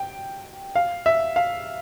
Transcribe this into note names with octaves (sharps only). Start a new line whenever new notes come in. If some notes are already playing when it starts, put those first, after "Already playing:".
Already playing: G5
F5
E5
F5